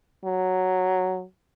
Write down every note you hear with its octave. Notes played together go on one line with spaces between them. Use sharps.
F#3